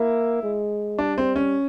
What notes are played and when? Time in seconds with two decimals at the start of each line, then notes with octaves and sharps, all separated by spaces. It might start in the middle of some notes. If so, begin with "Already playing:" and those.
Already playing: A#3 E4
0.43 G#3
0.98 G3 D4
1.18 C4
1.36 C#4